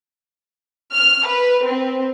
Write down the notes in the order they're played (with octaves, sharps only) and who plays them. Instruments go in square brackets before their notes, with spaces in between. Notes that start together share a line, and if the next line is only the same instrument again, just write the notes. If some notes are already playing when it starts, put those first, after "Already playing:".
[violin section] F6
B4
C4